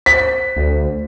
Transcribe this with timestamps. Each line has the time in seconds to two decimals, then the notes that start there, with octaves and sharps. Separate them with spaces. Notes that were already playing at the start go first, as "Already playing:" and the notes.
0.06 C5 B6
0.56 D2